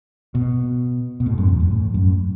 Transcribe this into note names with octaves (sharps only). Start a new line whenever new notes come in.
B2
B2
A2
F#2
E2
F#2
A2
F#2